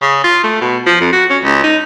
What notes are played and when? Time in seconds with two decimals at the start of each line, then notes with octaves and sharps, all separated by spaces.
0.02 C#3
0.24 F4
0.44 A3
0.61 B2
0.86 F3
1.00 F2
1.13 F#4
1.30 C#4
1.43 C#2
1.63 D#4